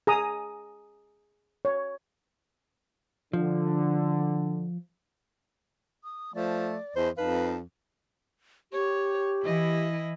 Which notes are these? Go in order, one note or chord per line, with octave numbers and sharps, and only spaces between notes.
G#4 A#5 D#6
C#5
D3 F3
D#6
F3 A3 D5
E2 C5 D#5 A5 B5
F2 D#4 B4 F5 A5
G4 C#5
E3 E4 D#5